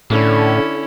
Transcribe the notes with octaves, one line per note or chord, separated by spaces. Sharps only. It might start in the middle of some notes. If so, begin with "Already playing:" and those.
A2 D3 C#4 E4